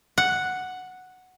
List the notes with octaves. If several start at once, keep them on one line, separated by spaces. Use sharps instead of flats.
F#5